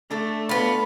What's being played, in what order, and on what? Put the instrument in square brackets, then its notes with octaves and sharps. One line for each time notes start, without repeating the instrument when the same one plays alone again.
[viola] A3 [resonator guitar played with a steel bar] D4 A4
[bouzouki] B3 F4 [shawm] B5